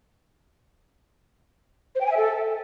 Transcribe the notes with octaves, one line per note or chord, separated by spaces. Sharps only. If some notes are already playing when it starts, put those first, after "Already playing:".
C5
G5
G#5
E5
A4